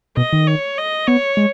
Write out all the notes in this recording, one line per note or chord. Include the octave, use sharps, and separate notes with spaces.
B2 D#5
D#3
C#5
D#5
B3 C#5
G#3